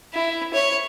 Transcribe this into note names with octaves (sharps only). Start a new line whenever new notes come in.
E4
C#5